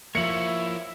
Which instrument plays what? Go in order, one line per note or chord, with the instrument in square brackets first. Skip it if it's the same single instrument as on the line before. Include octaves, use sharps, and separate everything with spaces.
[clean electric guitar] F3 A#3 [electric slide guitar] E4 F4 C#5 [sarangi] E5 [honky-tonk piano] C#7 F#7